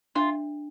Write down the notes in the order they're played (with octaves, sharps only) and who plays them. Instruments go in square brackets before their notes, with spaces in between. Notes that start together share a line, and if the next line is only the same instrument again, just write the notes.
[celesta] D4 [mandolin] F4